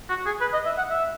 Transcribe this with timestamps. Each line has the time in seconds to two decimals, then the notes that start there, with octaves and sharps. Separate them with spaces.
0.09 F#4
0.26 G#4
0.41 B4
0.53 D#5
0.65 E5
0.77 F#5
0.90 E5